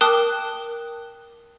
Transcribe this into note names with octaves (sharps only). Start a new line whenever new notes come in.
A#4 G5 A5 D6 D#6 F#6